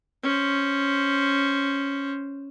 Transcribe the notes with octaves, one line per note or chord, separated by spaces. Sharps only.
C#4 C5